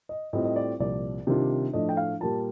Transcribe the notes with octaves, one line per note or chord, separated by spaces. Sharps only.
D#5
A2 G3 C4 F4 D#5
D#5
D5
C2 A#2 F3 D5
C3 D#3 G3 D4 F4
A2 F3 A3 D4 D#5
G5
F5
A#2 G3 A#3 F4 A5